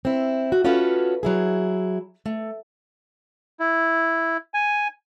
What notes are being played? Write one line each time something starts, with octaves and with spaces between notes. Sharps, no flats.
C4 E4
F#4
C#4 F4 F#4 A4 B4 C#5
F#3 E4 G#4
A3
E4
G#5